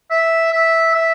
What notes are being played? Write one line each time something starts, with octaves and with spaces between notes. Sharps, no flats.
E5
E5
E5